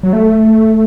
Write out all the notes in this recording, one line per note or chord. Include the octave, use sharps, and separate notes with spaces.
F#3
A3